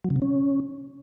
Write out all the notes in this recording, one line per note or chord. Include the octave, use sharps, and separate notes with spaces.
F#3
C#3
C3
C#4